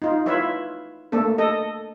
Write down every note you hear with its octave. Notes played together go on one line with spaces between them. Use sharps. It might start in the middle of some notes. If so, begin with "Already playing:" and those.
D#4 F4
E4 F4 B4 C#5 E5
A3 A#3 D4 A4
A4 D#5